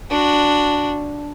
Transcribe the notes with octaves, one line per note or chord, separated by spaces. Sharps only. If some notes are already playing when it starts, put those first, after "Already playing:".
D4 F#4